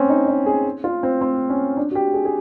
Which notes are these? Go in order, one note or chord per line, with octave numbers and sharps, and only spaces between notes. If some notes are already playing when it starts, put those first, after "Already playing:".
Already playing: C4 C#4
D#4
D#4
G#4
F4
C4
C4
C#4
D4
F#4
G4
G#4
G#4